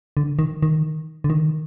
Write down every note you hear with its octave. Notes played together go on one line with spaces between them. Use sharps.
D3
D#3
D#3
D3
D#3